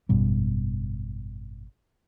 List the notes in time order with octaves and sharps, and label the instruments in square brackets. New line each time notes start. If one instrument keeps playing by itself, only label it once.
[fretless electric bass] G#1 F#2 B2 G3